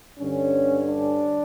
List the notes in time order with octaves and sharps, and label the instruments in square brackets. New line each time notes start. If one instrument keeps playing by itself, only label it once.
[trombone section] G2 D3 C#4
D4